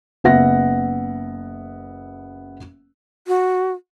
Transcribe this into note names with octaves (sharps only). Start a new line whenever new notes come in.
F#1 B3 E5 F#5 A#6
F#4